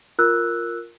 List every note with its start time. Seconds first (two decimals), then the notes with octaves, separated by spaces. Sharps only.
0.19 F4 A#4 E6 F#6